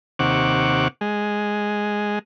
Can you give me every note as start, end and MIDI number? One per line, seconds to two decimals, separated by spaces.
0.19 0.88 39
0.19 0.88 48
0.19 0.88 78
0.19 0.88 85
0.19 0.88 86
1.01 2.19 56